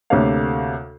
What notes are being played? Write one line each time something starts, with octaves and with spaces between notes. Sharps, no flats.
D2 C3 A3 A#3 C#5 F5